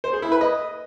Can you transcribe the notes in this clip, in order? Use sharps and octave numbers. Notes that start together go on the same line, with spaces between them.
C5
G#4
E4
B4
D#5